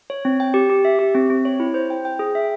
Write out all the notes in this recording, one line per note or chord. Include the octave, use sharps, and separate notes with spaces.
C#5
C4
G5
G4
G4
E5
G4
C4
C4
C#5
E4
C5
G5
G5
G#4
E5